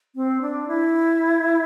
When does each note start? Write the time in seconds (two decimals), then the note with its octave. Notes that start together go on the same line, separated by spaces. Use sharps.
0.15 C4
0.41 D4
0.68 E4